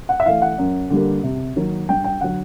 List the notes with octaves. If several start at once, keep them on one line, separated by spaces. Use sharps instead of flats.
F#5
E5
E3 A3 F5
F#5
F#2
D3 G3 A#3
C3
D#3 F#3 A#3
G2 G5
G5
D3 F#3 F#5